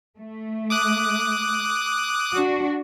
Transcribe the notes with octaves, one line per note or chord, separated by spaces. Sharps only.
A3
D6 D#6 F#6
D4 F#4